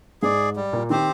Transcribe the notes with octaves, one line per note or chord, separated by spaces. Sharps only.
G#2 G#3 G#4 D5
G3
A#2 A#3
D#3 C4 G4 C5